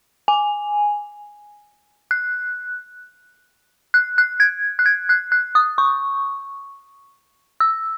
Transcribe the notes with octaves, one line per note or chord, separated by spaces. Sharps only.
G#5
F#6
F#6
F#6
G#6
F#6
G#6
F#6
F#6
D#6
C#6
E6